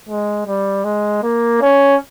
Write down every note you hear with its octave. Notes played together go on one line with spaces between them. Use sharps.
G#3
G3
G#3
A#3
C#4